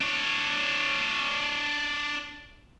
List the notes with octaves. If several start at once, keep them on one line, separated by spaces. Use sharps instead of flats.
D4 C#5